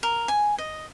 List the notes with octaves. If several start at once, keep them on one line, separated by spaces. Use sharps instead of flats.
A#4
G#5
D#5